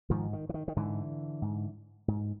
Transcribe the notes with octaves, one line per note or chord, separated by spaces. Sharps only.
G#2 D#3 F3
D#3
E3
D#3
D#3
G#2 D3 E3
G#2
G#2